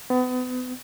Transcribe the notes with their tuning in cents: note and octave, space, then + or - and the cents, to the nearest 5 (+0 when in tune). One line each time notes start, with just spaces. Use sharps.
B3 +35